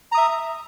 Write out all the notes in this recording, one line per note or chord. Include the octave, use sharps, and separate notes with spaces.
E5 A#5 D#6